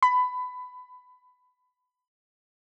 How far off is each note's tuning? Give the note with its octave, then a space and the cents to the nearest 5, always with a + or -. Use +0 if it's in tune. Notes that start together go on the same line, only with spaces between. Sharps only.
B5 +20